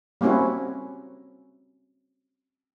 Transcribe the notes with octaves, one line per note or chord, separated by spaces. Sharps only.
G3 A#3 C4 C#4 E4 F#4